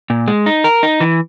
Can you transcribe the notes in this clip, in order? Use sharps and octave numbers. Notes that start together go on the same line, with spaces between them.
A#2
G#3
D#4
A#4
D#4
E3